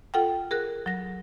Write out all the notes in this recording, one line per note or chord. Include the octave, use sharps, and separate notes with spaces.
F4 A4 F#5 G5
G#4 A#4 F#6
F#3 A#6